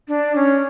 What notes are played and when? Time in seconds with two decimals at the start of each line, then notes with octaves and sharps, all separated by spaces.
0.08 D4
0.35 C#4